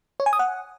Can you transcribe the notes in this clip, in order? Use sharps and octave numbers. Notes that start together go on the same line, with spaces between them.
C#5
G#5
D#6
F#5